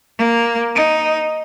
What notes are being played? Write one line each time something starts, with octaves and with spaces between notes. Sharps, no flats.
A#3
D#4